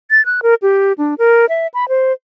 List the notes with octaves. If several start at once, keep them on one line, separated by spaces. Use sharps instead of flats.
A6
F#6
A#4
G4
D4
A#4
E5
B5
C5